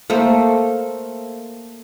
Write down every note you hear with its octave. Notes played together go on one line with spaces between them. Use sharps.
A3 A#3 C5